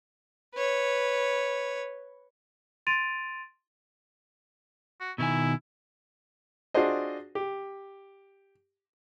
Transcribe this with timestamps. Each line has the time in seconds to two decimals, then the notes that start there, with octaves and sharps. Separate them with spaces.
0.55 B4 C#5
2.87 C6 A6 D7 D#7 F7
5.00 F#4
5.18 B2 D#3 E4 G#5
6.74 D4 F4 F#4 G#4 C5 D#5
7.35 G4